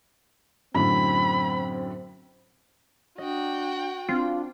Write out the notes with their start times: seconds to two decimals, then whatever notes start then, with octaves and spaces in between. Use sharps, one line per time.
0.75 F#2 A2 D3 C4 B5
3.18 D4 F#4 D#5 G5
4.09 C4 D4 F4 C7